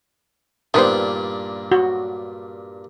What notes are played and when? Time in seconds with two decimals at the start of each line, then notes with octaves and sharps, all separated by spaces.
0.74 G2 A#2 D#3 B3 D4 C5
1.71 F#4